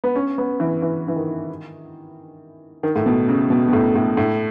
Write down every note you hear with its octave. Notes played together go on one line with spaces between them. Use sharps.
B3
C#4
B3
E3
E3
E3
D#3
D#3
A2
B2
C#3
B2
B2
A2
A2
A2